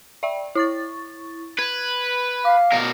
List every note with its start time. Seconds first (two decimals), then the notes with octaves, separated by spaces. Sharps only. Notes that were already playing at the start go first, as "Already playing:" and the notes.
0.23 D5 E5 G5
0.55 E4 C#6 A6
1.59 B4 G#6
2.45 F5 D6
2.72 B2 A#4